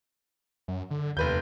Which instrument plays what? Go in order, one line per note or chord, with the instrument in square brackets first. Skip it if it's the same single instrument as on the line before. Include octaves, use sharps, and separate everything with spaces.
[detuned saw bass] F#2
D3
[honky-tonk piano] F1 B4 G6 [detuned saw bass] D#2